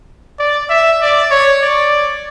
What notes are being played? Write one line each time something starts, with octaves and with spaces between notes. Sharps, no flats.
D5
E5
D5
C#5
D5